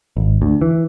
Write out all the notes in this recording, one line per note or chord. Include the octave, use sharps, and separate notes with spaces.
G#1
D2
E3